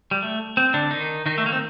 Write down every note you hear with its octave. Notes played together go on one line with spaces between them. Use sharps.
G3
A3
C4
D3 D4
D#3 D#4
D#3 D#4
A3
A#3
C4